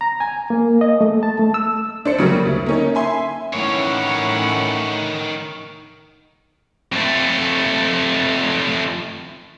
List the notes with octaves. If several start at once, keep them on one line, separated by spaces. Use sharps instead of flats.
A#5
G#5
A#3
D#5
A3
A5
A3
E6
D4 C5 C#7
C#3 F#3 G3 A#3
D2
A#3 C#4 D#4
E5 G#5 C6
A2 D#3 E3 C#4 C#5 F#5
F2 A3